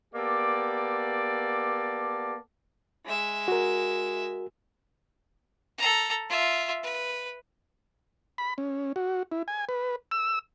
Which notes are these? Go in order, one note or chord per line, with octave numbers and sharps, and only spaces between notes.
A#3 B3 G4 A4 D5
G#3 E5
F#4 A#4
A4 A#5
F4 E5
B4
B5
C#4
F#4
E4
G#5
B4
E6